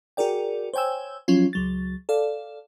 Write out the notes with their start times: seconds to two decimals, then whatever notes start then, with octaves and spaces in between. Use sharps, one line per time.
0.17 F#4 G#4 A#4 D5 G5
0.74 C5 C#5 G5 G#5 E6
1.28 F3 F#3 C#4 F4
1.53 C#2 F#3 A6
2.09 A4 D5 F5